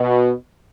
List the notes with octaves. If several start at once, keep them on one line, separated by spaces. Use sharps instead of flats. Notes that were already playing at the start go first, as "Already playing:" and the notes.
Already playing: B2